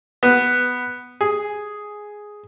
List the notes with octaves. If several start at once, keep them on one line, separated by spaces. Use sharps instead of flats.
B3
G#4